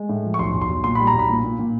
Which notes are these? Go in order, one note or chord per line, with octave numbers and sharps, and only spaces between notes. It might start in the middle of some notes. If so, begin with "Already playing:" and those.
Already playing: G#3
A2
F3
C#6
B1 C6
B1
C6
B1
A#2 C6
G3 B5
A#5
B1
B5
A#2
A#2
A#2